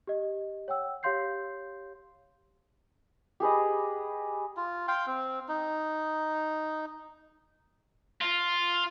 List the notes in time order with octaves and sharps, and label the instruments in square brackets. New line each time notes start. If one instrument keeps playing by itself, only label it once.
[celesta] G4 D#5
C#5 F#5 G5 E6
G4 C#5 F5 C6 G6 C7
[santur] G4 G#4 B4 D#5
[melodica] F4
F5 G5 C6
C4
D#4
[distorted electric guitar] F4